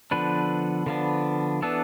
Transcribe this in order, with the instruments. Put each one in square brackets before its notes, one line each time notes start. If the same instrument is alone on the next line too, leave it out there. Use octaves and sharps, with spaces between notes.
[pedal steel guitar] D3 F3 B3 D4 B4
D3 F3 B3 D4
E3 B3 D4 A4